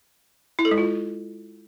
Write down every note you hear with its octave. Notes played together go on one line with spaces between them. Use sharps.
E4
A4
G#3
F4